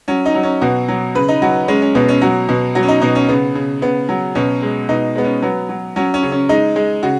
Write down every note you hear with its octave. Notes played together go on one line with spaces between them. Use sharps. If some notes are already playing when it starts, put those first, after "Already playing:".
F#3 C#4
D#4
F#3
C#4
B2 F#4
F#3
C#3 B4
D#4
F#3 F#4
G#3 C#4
C#4
B2 B3
C#4
F#3 F#4
B2
F#3 F#4
C#4
D#4
B2 D#4
C#4
C#3 B3
C#3
C#3 B3
F#3
B2 C#4
G#3
B2 D#4
G#3 B3
C#4
F#3 B3
F#3
F#3 C#4
C#4
C#3
C#4
G#3 D#4
G#3
C#3 F#4